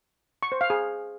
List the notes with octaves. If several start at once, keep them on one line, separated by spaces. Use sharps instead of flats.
C#6
C5
F5
G#4